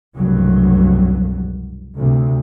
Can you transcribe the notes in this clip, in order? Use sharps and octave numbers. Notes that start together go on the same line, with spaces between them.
F1 C2 G2 B2 F#3
D2 C3